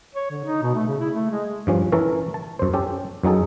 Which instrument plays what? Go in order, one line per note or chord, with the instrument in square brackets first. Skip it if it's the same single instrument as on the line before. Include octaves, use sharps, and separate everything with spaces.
[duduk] C#5
D3
D#4
B2
A3
C#3
E4
A3
G#3
[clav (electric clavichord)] G2 F3 C#4
E3 C#4 A4 A#4 C#5
A5
F#2 C5
C#4 G4 A4
F#2 F#3 D#4 G#4 A4